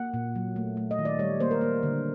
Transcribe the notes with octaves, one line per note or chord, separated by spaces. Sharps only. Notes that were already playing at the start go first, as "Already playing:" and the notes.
Already playing: A#3 F#5
A#2
F#3
A3
A3
D#5
D#3
D5
G3 C#5
A#3 C5
A#4
A#3
D3